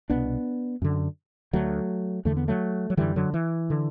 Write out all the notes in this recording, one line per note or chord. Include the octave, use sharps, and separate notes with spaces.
C2 B2 B3 D4
F#2 D3
D2 D3 F#3 A3
E2 D3 A3
B3
F#3 A3
F#3
F#2 D3 E3 G3
D3 F#3
E3
D3